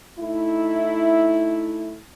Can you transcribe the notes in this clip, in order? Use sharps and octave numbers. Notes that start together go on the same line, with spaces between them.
A3 D#4 E4